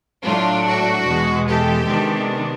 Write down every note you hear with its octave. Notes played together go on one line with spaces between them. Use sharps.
A2 F#3 A3 D4 F4
F#4
E2 B2 G#3
G4 A4
C3 D#3 G#3 B3 D4